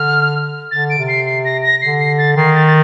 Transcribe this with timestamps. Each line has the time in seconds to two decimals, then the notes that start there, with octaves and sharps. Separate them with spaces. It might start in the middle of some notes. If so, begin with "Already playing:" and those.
Already playing: D3 F6
0.71 D3 A6
0.90 D7
0.99 C3
1.08 C7
1.26 C7
1.45 A#6
1.63 A#6
1.82 D3 C7
2.00 C7
2.18 A6
2.36 D#3 C7
2.55 A6
2.67 A6